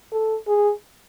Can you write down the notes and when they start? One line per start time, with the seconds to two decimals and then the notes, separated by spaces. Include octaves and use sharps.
0.12 A4
0.47 G#4